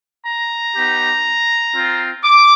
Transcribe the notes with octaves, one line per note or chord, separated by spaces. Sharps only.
A#5
B3 D#4 G4
C4 F4
D6